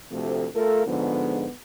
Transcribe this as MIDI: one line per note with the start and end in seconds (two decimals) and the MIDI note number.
0.12 0.47 38
0.12 0.47 48
0.12 0.48 53
0.12 0.47 57
0.55 0.85 57
0.55 0.87 65
0.55 0.87 69
0.55 0.87 70
0.87 1.45 44
0.87 1.45 50
0.87 1.45 53
0.87 1.54 59